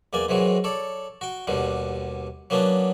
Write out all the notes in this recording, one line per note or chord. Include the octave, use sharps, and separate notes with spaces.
E2 A#3 D5 G#5
G#2 D#3 E3 F#3 G#3
A4 C#5 D5
F#4 G5
D#2 B2 D3 G3
F#3 A#3 B3 C#4 D4